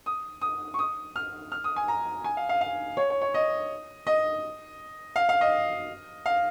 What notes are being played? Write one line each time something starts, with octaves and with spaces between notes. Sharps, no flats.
D#6
D#6
C#6
D#6
F6
F6
D#6
G#5
A#5
G#5
F5
F5
F5
C#5
C#5
C#5
D#5
D#5
F5
F5
D#5
F5